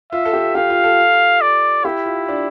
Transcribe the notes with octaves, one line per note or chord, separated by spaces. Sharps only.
F4 E5
A4
G4
G4 F5
F4
A4
D5
E4 G4
F4
D4